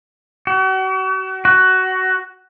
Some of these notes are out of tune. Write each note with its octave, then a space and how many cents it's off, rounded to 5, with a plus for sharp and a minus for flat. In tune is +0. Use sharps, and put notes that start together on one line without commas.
F#4 +40
F#4 +15